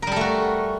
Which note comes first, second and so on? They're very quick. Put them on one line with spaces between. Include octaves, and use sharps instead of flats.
A#4 G3 A4 A3 F#4